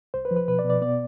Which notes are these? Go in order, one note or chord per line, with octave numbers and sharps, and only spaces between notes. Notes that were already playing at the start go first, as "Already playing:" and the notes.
C2 C5
B4
F3
B4
B2 B4
D5
B2
D5
B3 D5